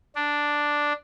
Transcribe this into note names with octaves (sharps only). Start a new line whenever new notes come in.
D4